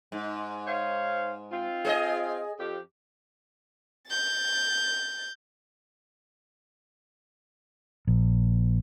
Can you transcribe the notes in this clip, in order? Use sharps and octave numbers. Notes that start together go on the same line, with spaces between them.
G#2
C5 C#5 F5
C4 F4
G#4 C5 D#5
F2 G4
G6 A6
A#1